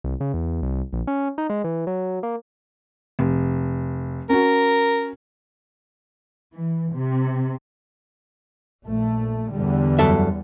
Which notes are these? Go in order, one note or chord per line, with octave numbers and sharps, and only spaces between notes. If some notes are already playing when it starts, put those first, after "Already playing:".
C2
C#3
E2
C2
A#1
C#4
D#4
G#3
E3
F#3
A#3
F1
C#4 F#4 A#4
E3
C3
A#1 A3
E2 D3 G3
F#2 A4 E5